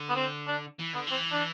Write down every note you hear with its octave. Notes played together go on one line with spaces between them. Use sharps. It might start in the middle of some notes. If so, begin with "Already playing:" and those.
Already playing: D3
B3
C4
D4
E3
D3 B3
E3 C4
D4